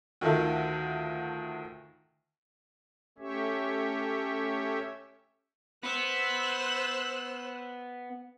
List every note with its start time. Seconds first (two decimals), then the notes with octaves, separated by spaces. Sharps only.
0.21 D2 D#3 F4 A4 E5
3.18 A3 C#4 G4 C#5 E5
5.84 B3 C5 E6 F#6